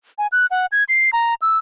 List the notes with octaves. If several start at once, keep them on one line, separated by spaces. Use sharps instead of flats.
G#5
F#6
F#5
G#6
C7
A#5
E6